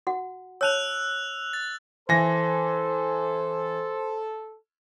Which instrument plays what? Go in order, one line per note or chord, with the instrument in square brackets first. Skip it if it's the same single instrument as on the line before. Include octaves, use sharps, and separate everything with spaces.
[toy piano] F#4 F#5
[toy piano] C#5 A5 [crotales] E6 F#6 F7
[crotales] A6
[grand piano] E3 A#6 [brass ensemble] A4 [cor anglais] C5